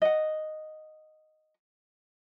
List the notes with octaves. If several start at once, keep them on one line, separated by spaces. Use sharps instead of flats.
D#5 F#5